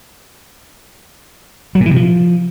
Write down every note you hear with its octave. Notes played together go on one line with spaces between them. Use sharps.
F#3
A#2
E3
C3
F3